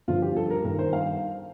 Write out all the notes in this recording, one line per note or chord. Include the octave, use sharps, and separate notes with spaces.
G2 D3 F3 F4
G4
A4
A#4
G2 D#3 A#4
C5
F5